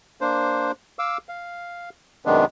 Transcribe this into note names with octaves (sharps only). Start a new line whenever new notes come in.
A#3 D4 C5
F5 D6 E6
F5
F#2 C3 D#3 G#3 B3 D4